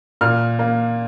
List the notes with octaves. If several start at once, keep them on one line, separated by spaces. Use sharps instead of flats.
A#2 F6
A#3